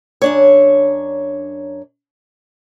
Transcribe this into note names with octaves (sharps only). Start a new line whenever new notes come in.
F#2 D4 C#5